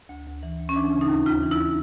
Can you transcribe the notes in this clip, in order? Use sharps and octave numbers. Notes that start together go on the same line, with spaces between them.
D2
D2
E3
D2
C#4
E3 D4
C#3
D#4
D#2
D#2 F4
E3
E4